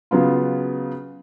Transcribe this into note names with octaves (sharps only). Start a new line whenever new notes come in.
C#3 F#3 B3 F4